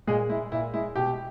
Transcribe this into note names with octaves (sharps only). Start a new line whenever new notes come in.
A#2 G#3 G#4
G#3 E4
A#2 E4
G#3 E4
B2 G4